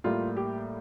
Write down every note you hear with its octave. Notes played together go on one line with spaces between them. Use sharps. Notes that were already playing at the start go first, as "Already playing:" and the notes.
A2 G3 A#3 F4
G4